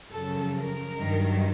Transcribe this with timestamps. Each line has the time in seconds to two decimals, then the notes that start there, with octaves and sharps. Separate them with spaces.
0.12 F#2 C#3 F3 A4
0.56 A#4
1.01 G2 D#3 F#3